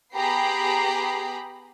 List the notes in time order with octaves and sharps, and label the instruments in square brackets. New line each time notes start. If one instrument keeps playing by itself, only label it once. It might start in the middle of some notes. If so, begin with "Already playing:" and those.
[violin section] B3 G4 G#4 A#5 B5 C7